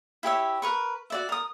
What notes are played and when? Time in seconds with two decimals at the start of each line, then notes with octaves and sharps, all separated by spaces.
0.23 E4 G4 C#5 E5
0.62 A#4 B4 C#6
1.10 F#4 D5 E5
1.29 A#4 D#6